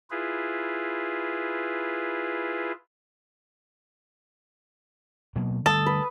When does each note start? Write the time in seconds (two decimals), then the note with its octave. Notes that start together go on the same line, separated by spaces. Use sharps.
0.11 E4 F4 G#4 B4
5.36 B2 F#3 A#3
5.66 D3 G3 A3 A4 D#6
5.86 B4